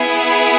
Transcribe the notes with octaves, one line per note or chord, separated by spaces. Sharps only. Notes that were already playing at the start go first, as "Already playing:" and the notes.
Already playing: B3 E4 G#4